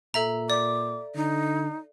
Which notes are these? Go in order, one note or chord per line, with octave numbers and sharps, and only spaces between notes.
A#2 A4 E5 A#5
D5 D6
D3 D#4